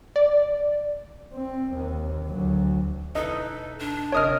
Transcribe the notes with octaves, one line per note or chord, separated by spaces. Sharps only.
D5
C4
D#2
D2 F#3
E1 D#4 E4 A4 B4 D#5
D4
G1 C3 A#4 C#5 D#5 D#6 F6